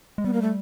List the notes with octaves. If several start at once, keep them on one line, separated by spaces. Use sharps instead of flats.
G#3
G3 B3
A#3
A3